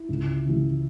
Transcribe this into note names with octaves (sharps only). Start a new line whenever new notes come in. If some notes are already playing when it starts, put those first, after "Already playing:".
Already playing: E4
C#2
C#3 E3